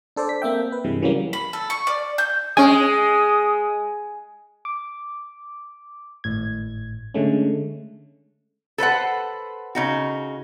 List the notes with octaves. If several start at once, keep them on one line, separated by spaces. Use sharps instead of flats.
D4 A4 C5 D5
B6
A#3 C4 E5 G5
B4
G2 C3 E3 G#3
C#3 E3 F#3 G3 A#3
B5
A4
C#6
D5
G6
G#3 C#4 G#5 D#6
D6
G#1 A2 G#6
D3 G#3 A3 C#4
A4 B4 C5 F#5
C#3 D#4 F#4